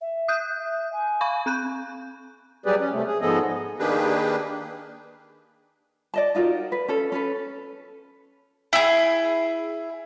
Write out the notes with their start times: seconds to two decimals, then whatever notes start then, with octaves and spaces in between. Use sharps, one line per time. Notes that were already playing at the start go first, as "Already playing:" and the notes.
0.01 E5
0.28 D#6 F#6 G6
0.59 E5
0.93 G#5
1.21 F5 B5 C#6
1.46 C4 F#6 G6
2.66 F#3 G3 G4 G#4 B4 D5
2.79 C#4
2.92 C3 A3
3.06 G#4
3.21 G#2 F3 B3 G#4 A4 D#5
3.79 D#3 A#3 D4 G4 G#4 B4
6.14 D5 D#5 A5
6.35 D#4 F4 F#4 A#4
6.72 B4
6.88 C#4 A4
7.12 C#4 A4 B4
8.73 E4 G#4